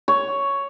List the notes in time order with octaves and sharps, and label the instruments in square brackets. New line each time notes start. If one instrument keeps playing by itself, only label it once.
[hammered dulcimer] C#5